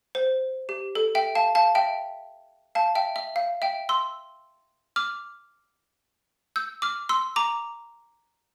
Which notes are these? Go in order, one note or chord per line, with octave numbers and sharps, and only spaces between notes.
C5
G4
A4
E5 G5
F5 A5
F5 A5
E5 G5
F5 A5
E5 G5
E5
F5
E5 G5
C6 E6
D6 F6
E6 G6
D6 F6
C6 E6
A#5 D6